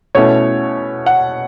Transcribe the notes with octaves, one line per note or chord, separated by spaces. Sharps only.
B2 A3 C#4 E4 C#5
F#5